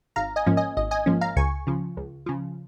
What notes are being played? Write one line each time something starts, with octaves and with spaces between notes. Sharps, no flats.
G#1 F5 A#5
D#5 G#5
G#2 F3 A#3 C#4
D#5 G#5
G#1 D#5
D#5 G#5
G#2 F3 A#3 C#4
F5 A#5
C#2 G#5 C#6
C#3 F3
C#2
C#3 F3